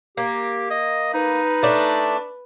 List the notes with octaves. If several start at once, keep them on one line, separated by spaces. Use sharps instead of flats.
A#3 G4
D#5
D#4 B4
A3 D4